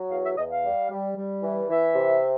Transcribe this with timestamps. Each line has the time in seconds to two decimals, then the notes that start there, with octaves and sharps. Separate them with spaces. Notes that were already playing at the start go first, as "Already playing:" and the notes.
Already playing: F#3
0.10 E2 F5
0.24 E5
0.37 E2 D#5
0.50 F5
0.64 G3
0.90 G3
1.16 G3
1.43 E3
1.69 E3 E5
1.95 C3